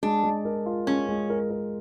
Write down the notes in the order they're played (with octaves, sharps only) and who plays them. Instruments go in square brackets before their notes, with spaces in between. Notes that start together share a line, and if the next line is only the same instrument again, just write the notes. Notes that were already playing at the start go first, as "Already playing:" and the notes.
[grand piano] G#3 [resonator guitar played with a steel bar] D4
[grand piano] G#3
A#4
F4
[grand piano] G#3 [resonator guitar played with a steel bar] C#4
[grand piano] G#3
A#4
A#4